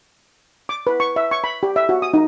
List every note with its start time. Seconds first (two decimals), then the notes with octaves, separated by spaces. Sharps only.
0.69 D6
0.87 B4
1.00 C#6
1.16 E5
1.31 C#6
1.44 B5
1.63 G4
1.76 E5
1.89 F#4
2.02 D#6
2.14 D#4